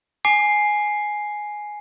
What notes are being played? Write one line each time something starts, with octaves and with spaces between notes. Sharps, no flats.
G#5 D6 C7